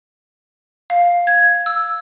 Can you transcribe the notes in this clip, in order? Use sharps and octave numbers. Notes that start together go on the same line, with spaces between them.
F5
G#6
E6